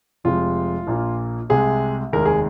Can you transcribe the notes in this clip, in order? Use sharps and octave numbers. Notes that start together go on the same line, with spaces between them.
F1 F2 C3 F3 G#3 F4
A#1 A#2 A#3
C2 C3 G#3 G#4
F1 D#2 D#3 G#3 A#4
G#4